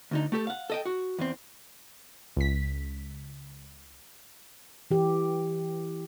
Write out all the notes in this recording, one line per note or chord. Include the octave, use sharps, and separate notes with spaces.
D2 D3 D#4
A3 G4 A4
F5 F#5
A4 D#5 G5
F#4
E2 C4
C#2 B6
E3 G4